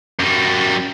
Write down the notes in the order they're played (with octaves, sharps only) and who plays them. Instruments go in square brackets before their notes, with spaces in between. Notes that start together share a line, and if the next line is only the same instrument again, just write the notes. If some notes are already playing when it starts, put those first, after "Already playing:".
[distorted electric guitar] F#2 G3